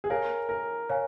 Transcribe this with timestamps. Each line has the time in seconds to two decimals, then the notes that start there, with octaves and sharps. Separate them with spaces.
0.04 G#4
0.10 A#4 C#5 F5 G#5
0.49 A#4
0.89 C#5 F5 G#5